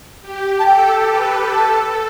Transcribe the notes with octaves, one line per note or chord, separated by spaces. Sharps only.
G4
A5
A4 G5
B4
A4 A5